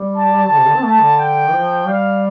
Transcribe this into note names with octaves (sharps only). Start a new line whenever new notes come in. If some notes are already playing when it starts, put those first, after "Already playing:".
Already playing: G3
A5
D3
C3
D3
C4
A3 A5
D3
G5
F3
G3 F5